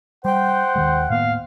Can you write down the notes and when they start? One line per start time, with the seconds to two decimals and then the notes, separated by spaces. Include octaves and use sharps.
0.25 G3 C5 F#5 G5
0.76 D#2 D#3 G#3
1.10 A2 A#3 B3 F5